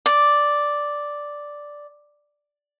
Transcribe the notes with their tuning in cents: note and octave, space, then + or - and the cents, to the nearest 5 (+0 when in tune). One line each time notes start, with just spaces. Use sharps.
D5 +0